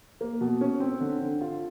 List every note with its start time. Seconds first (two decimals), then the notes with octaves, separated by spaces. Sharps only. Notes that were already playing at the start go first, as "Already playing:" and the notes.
0.21 A#3
0.41 B2
0.61 C#4
0.80 C4
1.00 D3
1.21 D3
1.41 F4